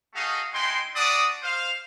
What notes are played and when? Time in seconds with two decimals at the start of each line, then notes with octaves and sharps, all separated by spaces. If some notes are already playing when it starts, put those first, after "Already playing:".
0.14 A3 D#4 F#4 G#4 D#5 F5
0.53 G#3 D#4 E4 G5 C6
0.95 G3 D4 F#4 D5 D#6
1.42 C5 F5